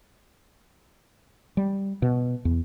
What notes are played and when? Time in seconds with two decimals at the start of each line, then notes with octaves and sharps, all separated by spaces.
1.57 G3
2.02 B2
2.45 E2